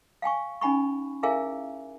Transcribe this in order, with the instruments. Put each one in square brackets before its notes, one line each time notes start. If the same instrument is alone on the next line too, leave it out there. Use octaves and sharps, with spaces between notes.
[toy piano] F5 G5 G#5 C#6
C#4 D#4 G#5 B5 C#6
E4 G#4 A#4 E5 F5 G#5